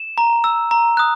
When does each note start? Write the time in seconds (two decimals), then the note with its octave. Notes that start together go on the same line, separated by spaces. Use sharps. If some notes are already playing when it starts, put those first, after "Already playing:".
Already playing: E7
0.18 A#5
0.44 E6
0.71 A#5
0.97 D#6 F#6